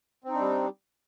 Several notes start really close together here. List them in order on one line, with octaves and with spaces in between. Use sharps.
C4 D#4 D4 G3